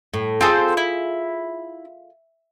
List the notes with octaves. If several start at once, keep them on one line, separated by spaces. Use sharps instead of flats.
A2
C4 F4 G#4 A4 C5
E4